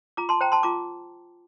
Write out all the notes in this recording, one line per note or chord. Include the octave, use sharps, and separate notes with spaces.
F4 A#5 D6
A5 C6
C5 G5 A#5
A5 C6
F4 A#5 D6